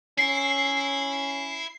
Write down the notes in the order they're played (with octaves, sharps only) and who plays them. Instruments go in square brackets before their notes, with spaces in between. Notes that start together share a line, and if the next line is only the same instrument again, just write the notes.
[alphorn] C#4 [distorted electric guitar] E4 [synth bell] C7